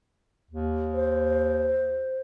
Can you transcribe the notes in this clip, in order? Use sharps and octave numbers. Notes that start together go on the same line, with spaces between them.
D#2
C5